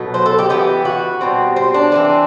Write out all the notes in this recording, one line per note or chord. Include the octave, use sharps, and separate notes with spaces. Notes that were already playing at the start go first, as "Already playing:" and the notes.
Already playing: B2 F#3 A3
C5
A4
G4
E3 G3 B3 G4
F#4
B2 G3 C4
C4
D4
E3 A3 C4